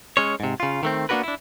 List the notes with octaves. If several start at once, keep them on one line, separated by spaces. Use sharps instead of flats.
G#3 C#4 C#5
G#2 C3
C#3 F4
D#3 A3 C4
A#3 B3 D4 F#4 A#4 B4
D4 E4